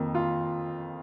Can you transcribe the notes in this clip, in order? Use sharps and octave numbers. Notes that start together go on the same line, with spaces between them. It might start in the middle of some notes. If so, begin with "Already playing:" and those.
Already playing: F2 D#3 A#3
F4